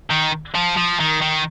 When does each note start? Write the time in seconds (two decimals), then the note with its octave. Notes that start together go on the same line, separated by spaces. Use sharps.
0.10 D#3
0.54 F3
0.77 F3
1.00 D#3
1.21 D#3